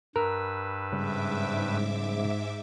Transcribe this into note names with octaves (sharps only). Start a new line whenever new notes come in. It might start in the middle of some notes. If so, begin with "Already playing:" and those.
G2 A#4 B4 E6
G#2 C#3 G3 E5 D6